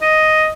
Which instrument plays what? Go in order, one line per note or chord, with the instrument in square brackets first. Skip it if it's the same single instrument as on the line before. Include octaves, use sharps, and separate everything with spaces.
[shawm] D#5